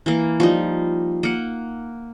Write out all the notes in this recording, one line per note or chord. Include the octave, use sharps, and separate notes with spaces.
E3 A#3
F3 G3 D#4
A#3 F#5